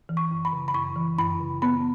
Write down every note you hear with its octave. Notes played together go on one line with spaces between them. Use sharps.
E3
C#6
F#2
B5
C#3
B5
F#2 C#6
E3
F#2 B5
C#3
B3 B5